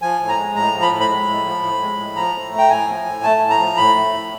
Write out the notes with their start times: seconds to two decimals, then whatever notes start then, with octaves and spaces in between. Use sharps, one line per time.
0.02 F3 G#5
0.20 A2
0.29 A#5
0.37 G#3
0.55 A2 A#5
0.73 F3
0.82 B5
0.91 A2
1.00 B5
1.09 G#3
1.26 A2
1.45 F3
1.63 A2
1.80 G#3
1.98 A2
2.16 F3 A#5
2.34 A2
2.52 A3
2.58 G5
2.70 A2 G#5
2.88 F3
3.05 A2
3.23 A3 A5
3.41 A2
3.50 A#5
3.59 F3
3.77 A2 B5
3.95 A3
4.13 A2